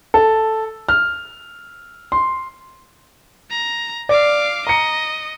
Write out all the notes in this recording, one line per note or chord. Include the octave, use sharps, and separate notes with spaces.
A4
F6
C6
A#5
D5 F5 D6
D#5 A#5 C#7